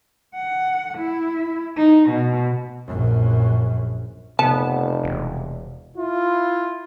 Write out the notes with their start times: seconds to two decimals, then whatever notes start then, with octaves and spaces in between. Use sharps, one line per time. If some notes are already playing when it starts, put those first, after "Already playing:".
0.35 F#5
0.98 E4
1.77 D#4
2.10 B2
2.87 A#1 F#2
4.39 F1 C3 B3 A5
5.03 E1
5.97 E4 F4